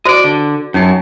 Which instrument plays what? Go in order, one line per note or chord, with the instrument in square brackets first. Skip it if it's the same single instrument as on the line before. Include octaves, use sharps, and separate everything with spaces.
[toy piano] F#4 C5 [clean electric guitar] D5 D#5
[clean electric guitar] D3
[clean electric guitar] F#2 [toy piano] C#4 D#4 G5